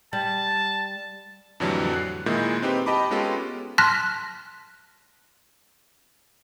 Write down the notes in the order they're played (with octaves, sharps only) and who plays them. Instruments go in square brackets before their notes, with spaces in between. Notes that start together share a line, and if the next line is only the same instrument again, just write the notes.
[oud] G3 [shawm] A5
[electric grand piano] F2 A2 D3 E3 F#3 G3
F#6 C7
A#2 D#3 G#3 E4 D#6 G6
C4 D#4 G4 B4
G4 D#5 A5 B5 D6
G#3 B3 C#4 F4 G4 A4
[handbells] A5 C6 F6 F#6 A#6 B6